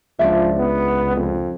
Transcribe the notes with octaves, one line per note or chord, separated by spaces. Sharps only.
C#2 F3 D4 D5 E5
B3
F2